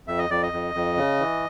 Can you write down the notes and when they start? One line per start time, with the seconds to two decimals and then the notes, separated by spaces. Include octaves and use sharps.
0.07 F2 E5
0.18 D#5
0.30 F2 D5
0.43 D#5
0.53 F2
0.74 F2
0.97 C#3
1.20 E3